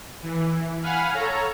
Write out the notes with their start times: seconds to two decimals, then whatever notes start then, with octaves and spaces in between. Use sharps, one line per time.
0.23 E3
0.82 F5 F#5 G#5 B5 F6
1.14 A4 C#5 A#5